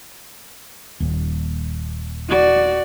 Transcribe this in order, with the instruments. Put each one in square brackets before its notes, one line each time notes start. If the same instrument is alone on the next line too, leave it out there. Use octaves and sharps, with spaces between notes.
[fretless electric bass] D#1 D#2 A#2
[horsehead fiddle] F#4 D5